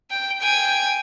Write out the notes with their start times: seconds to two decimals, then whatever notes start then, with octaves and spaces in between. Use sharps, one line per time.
0.11 G5
0.41 G5 G#5